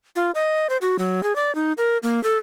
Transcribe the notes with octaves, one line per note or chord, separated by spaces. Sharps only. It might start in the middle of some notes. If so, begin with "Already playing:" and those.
F4
D#5
C5
F#4
F#3
G#4
D5
D#4
A#4
A#3
A4